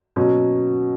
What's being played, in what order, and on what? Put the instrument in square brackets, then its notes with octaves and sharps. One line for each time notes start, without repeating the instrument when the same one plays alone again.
[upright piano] B2 F#3 A#3 C#4